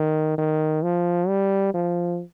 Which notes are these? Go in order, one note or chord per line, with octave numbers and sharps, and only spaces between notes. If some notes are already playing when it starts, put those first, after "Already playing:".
Already playing: D#3
D#3
F3
G3
F3